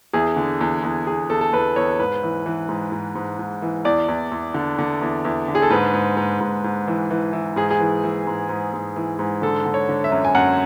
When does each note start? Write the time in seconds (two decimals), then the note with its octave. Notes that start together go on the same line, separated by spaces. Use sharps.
0.13 E2 G#4
0.36 D3
0.61 E2
0.83 E2
1.07 E2 G#4
1.29 E2 A4
1.41 A4
1.52 E2 B4
1.76 E2 C#5
1.99 G#2 B4
2.23 E3
2.46 E3
2.69 G#2
2.92 G#2
3.15 G#2
3.39 G#2
3.62 E3
3.85 E2 D5
4.08 E2
4.32 E2
4.54 D3
4.79 D3
5.02 E2
5.25 E2
5.48 D3
5.55 G#4
5.62 A4
5.70 G#2 B4
5.94 G#2
6.17 G#2
6.40 G#2
6.64 G#2
6.88 E3
7.11 E3
7.33 E3
7.56 G#2 G#4
7.71 G#4
7.80 E3
8.04 E3
8.27 G#2
8.49 G#2
8.73 G#2
8.96 E3
9.19 G#2
9.42 D3 A4
9.66 D3
9.74 C#5
9.89 D3
10.04 E5
10.12 F#2
10.25 G#5
10.35 F#2 F#5